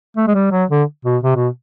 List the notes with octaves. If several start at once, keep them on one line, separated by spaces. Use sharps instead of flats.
A3
G#3
G3
F#3
D3
B2
C3
B2